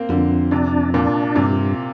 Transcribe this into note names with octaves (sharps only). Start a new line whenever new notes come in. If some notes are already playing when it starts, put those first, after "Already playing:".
Already playing: A#3 C4
F2 D3
C3 D4
A#2 D4
G2 C3